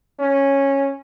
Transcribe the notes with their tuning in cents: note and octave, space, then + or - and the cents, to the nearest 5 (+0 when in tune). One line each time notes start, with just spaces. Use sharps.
C#4 -10